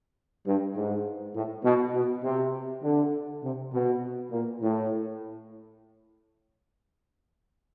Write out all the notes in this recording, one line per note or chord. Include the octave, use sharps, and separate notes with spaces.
G2
G#2
A2
B2
B2
C3
D3
C3
B2
A#2
A2